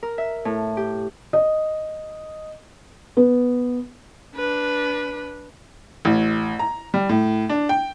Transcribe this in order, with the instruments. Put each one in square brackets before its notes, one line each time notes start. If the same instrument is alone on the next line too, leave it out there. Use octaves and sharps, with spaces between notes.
[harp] A#4
E5
A2
G4
[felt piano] D#5
B3
[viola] D4 B4
[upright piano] A1
A#5
G3
A2
D4
G5